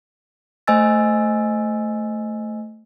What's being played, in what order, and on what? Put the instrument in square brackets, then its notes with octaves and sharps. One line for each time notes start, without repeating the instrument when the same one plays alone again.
[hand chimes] A3 C5 D#5 G#5 E6 A6